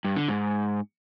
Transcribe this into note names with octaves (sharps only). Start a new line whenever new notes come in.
G2
D3
G#2